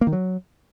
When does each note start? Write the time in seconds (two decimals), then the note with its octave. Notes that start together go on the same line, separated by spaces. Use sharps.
0.01 A#3
0.07 D#3
0.13 F#3